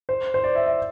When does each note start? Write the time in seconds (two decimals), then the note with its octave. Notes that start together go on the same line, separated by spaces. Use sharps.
0.09 C5
0.34 C5
0.44 D5
0.55 E5
0.67 E5